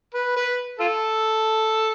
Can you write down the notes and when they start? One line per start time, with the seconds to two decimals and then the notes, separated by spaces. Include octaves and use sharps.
0.14 B4
0.37 B4
0.80 F4 A4